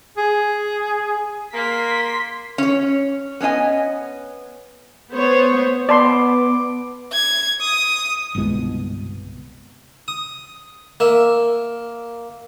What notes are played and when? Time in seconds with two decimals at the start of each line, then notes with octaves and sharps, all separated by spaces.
0.17 G#4
1.54 A#3 C6 B6
2.58 C#4 C#5
3.40 B3 C#4 D4 D#5 G#5
5.12 B3 C5 C#5
5.89 B3 D5 A5 C6 D6
7.13 G#6
7.61 D#6
8.35 G1 C2 B2 G#3
10.08 D#6
11.00 A#3 E5